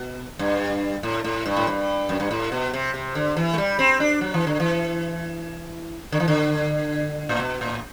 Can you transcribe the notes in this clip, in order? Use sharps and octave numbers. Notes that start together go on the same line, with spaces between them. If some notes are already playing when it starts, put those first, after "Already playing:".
Already playing: B2
G2
A2
A2
G2
A2
G2
F#2
G2
A2
B2
C3
C3
D3
E3
A3
G3
C4
D4
F#3
E3
D3
E3
D3
E3
D3
A2
B2
A2